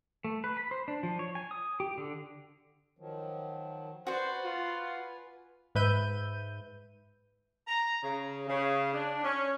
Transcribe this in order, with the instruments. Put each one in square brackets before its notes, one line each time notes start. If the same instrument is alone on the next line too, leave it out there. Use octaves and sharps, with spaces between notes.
[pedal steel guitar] A3
B4
B5
C5
D4
F3
C#5
G#5
D#6
G4
D3
[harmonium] D#3 F3 F#3
[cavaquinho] F#4 D5 [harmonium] B4 G#5 [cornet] C5 [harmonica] F#5
[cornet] F4
[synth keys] G#2 B4 E5 G6 D#7
[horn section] A#5
C#3
C#3
D4
C#4